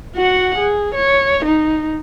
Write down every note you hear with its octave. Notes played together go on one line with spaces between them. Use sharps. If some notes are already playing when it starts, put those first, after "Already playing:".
F#4 F#5
G#4
C#5
D#4